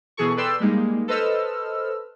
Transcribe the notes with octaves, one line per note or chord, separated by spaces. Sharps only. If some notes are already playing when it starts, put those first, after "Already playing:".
B2 E3 G#4 A4 C#6
A4 B4 D5 G5 C6 E6
G3 G#3 A#3 D#4
A4 B4 C5 D#5 E6 F6